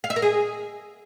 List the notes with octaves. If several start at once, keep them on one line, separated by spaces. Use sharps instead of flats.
F5
E5
A#4
G#4